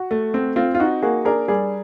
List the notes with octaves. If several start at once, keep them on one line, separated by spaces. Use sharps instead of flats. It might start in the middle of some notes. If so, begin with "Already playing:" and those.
Already playing: F#4
A3
C4
C4 F4
F4
D#4 F#4
A#3 F#4 G#4
D4 G#4 A#4
G3 G#4 A#4